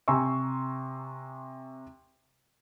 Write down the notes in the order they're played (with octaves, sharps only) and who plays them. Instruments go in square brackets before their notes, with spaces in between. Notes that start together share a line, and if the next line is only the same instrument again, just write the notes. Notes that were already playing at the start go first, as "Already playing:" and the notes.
[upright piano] C3 G#5 A#5 C6 C#6 E6